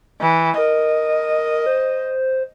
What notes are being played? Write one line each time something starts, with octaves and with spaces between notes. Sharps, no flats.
E3
A#4 D#5
C5